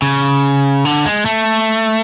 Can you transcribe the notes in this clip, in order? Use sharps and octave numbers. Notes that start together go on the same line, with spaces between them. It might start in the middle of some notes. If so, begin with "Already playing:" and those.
C#3
D3
G#3
A3